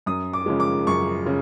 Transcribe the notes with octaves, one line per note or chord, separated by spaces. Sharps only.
F#2 D#6
D6
C#3 F3 G#3
D6
F#2 C#6
C#3